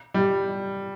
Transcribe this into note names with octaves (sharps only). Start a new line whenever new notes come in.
G3